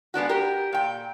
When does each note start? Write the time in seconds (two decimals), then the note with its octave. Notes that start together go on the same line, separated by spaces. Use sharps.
0.14 G#3 B3 D4 F#4
0.29 G4 A#4
0.73 A#2 G5